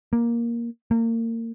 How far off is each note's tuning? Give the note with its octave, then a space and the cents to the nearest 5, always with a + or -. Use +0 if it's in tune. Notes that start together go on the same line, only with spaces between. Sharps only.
A#3 +10
A#3 -30